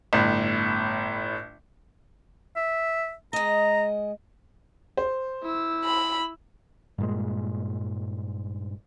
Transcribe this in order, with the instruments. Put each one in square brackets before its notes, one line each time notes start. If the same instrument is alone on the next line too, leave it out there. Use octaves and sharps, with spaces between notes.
[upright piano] G1 A2
[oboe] E5
[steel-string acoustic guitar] G#3 D#5 [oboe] A#5
[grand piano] C5
[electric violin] E4 E6
[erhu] B5
[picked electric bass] G2 A#2 G#3